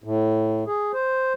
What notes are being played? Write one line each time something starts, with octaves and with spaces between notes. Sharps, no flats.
A2
G#4
C5